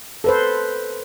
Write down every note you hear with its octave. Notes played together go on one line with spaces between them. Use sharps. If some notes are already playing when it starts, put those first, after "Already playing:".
A4 B4 C5